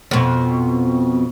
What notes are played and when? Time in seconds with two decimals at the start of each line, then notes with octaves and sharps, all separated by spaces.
0.11 F2 B2